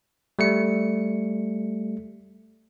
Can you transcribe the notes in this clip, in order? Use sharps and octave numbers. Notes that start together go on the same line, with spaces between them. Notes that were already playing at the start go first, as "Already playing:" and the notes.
G3 A3 C#7